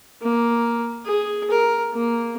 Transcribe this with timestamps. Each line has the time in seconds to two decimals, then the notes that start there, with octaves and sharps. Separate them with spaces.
0.22 A#3
1.05 G#4
1.51 A#4
1.93 A#3